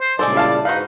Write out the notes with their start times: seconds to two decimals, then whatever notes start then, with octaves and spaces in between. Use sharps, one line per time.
0.01 C5
0.19 A#2 C#3 G3 G#3 A4 C5 D5
0.35 E4 F5 A5
0.65 G#2 D#4 F#4 B4 F5